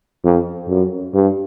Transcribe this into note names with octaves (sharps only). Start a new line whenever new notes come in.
F2
F#2
G2